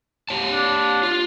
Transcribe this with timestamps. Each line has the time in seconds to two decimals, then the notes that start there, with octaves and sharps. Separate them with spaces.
0.29 G4 C#5 A5
0.52 D4
1.03 F4